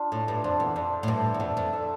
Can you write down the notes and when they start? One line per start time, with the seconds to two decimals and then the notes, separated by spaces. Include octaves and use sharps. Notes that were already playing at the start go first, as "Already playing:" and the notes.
Already playing: D4 F4 F5
0.12 A2 A3
0.28 G2
0.44 F2 D4 A4 C5
0.60 E2
0.76 F2 D4
1.03 A2
1.08 G2 A4 E5
1.34 E2
1.40 F2 A3
1.57 F2
1.73 D4 A4 E5